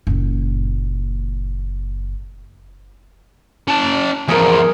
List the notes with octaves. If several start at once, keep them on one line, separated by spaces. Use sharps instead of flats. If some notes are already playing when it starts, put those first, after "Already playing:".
F#1 A#2
C#4 A5
E2 F3 G#4 A#4